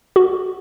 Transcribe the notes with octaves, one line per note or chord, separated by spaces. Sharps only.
F#4